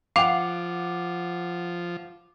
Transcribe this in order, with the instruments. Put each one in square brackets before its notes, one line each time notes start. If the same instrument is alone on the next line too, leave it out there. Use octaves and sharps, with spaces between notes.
[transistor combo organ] F3 [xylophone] F5 F7 [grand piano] F#5 D6